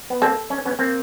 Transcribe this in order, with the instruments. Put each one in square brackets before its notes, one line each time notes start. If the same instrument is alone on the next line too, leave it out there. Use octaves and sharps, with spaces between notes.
[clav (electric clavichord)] B3
[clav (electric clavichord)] A#3 C4 [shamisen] A4
[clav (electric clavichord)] C#4
B3 C#4
A#3 C4